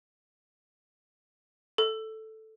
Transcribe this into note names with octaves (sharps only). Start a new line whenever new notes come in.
A4